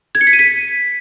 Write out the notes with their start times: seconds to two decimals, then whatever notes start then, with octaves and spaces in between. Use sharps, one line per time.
0.15 G#6
0.21 C#7
0.27 B6
0.33 D#7
0.39 B6